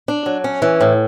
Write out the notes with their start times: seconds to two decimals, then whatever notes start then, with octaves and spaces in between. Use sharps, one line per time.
0.08 D4
0.26 F#3
0.44 C#4
0.62 E3
0.81 A2